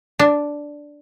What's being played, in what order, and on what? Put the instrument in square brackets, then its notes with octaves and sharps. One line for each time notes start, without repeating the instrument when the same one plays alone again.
[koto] D4